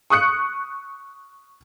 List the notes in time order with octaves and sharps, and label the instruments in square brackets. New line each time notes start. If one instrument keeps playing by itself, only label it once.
[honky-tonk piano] C#6 D#6 F#6 C#7